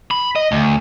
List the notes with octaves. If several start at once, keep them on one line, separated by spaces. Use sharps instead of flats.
B5
D#5
D2